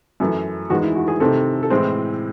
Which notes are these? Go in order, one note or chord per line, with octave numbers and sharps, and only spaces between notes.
F#2 E3 A3 E4
E2 D#3 G#3 F#4
E4
F#4
G#4
C3 D#3 A3 C4 A4
A4
A2 E3 G#3 C4 C5